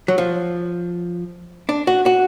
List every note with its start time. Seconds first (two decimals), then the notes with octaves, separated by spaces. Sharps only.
0.08 F#3
0.18 F3
1.69 D4
1.87 F#4
2.06 F#4